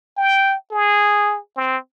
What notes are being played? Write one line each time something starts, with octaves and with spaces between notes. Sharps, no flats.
G5
G#4
C4